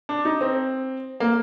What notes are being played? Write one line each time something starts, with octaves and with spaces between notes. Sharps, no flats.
D4
D#4
C4
A#3